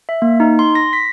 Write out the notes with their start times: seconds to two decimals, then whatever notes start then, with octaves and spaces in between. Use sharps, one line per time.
0.09 E5
0.22 A#3
0.40 D#4
0.59 C6
0.75 A#6
0.93 B6